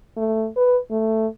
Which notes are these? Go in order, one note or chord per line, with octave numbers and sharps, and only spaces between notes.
A3
B4
A3